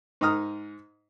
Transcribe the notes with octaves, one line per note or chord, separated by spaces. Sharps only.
G#2 D#4 A#5 D#6 F6